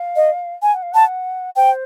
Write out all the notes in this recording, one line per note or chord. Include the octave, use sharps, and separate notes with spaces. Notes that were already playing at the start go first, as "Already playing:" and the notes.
Already playing: F5
D#5
G#5
F#5
F5
F#5 A5
C5 G5